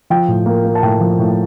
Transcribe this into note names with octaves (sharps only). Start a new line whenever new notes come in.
F3 G5
A2
A#3
A#3
A5
A2 G5
F3
A2